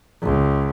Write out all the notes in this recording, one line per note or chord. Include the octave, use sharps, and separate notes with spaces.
C#2